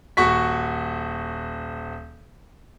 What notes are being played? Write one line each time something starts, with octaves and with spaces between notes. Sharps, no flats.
D#1 F#4 C#6 B6